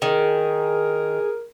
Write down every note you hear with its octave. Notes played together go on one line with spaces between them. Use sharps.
D#3 G#4 A#4